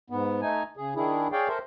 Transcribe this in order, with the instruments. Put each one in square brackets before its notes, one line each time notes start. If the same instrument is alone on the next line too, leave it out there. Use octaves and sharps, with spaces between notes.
[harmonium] G#2 B3
A3 D#4 G#5
C#3 G#4
D#3 D4 E4 G#4
G#4 C#5 D5 F5 G5
A4 A#4 C5 E5